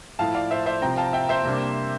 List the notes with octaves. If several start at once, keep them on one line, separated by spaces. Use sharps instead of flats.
A2 F3 A3 E4 F5 A5
D5 F5
C5 E5
C5 E5
C3 F3 C4 G5 A#5
F5 A5
E5 G5
C5 E5
C3 G3 A#3 D4